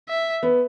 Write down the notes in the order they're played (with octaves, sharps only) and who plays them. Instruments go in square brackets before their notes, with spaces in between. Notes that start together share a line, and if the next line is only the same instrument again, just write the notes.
[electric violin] E5
[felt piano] B3